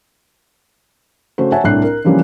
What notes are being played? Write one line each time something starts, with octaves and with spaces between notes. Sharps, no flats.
C#3 A3 F#4 C5
C#5 E5 F#5 G#5 A5
C2 A2 D4 F#6 C7
A#4
C#3 E3 F3 G3 A#3 C#4